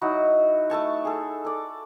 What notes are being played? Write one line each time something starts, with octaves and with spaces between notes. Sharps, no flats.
F#3 D#4 E4 F#4
A3 A4 A5 C#6
G#4 A4
A4 D5